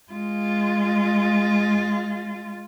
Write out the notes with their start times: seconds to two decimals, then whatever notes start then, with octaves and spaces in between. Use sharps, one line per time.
0.12 G#3 F4